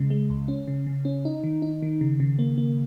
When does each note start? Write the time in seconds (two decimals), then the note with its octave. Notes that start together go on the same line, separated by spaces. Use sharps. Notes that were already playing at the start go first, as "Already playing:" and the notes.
Already playing: C#3 G#3
0.10 G#3
0.30 C#2
0.48 C#4
0.68 C#3
0.87 C#3
1.05 C#4
1.25 D#4
1.44 D#3
1.62 D#4
1.82 D#3
2.01 C#3
2.20 C#3
2.39 A#3
2.58 A#3